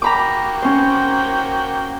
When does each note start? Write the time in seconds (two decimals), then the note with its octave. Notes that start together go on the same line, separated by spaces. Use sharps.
0.02 A#3 F#4 G5 A#5 B5 D6
0.62 C#4 C5